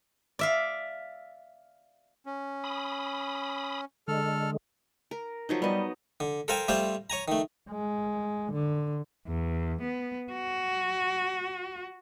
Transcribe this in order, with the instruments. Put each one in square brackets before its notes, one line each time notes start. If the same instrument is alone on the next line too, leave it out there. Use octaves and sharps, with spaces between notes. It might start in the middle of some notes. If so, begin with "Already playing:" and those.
[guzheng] D5 E5 F5
[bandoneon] C#4
[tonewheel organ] B5 D#6
[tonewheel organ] D3 G#3 [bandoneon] A4 F6
[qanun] A#4
F3 F#3 D#4
[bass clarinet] G3 [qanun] B3 D#5
[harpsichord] D3
A4 A#4 C5 F5 G5 G#5
G3 A3 C4 F4 C5
C#5 G#5 A#5
D#3 A3
[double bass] G#3
D3
[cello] E2
B3
F#4